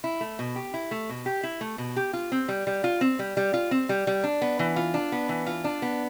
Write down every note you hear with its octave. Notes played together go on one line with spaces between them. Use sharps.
E4
A3
B2
G4
E4
A3
B2
G4
E4
A3
B2
G4
F4
C4
G3
G3
F4
C4
G3
G3
F4
C4
G3
G3
D4
B3
E3
F4
D4
B3
E3
F4
D4
B3